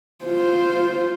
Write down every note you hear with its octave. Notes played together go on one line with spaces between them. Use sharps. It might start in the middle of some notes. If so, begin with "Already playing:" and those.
F4 C5